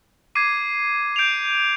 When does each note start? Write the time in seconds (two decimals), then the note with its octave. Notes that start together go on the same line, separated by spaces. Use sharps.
0.35 D6 G#6 C7 D#7
1.16 G6 D7 F7